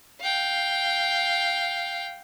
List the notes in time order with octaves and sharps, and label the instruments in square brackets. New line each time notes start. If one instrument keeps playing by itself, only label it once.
[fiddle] F5 G5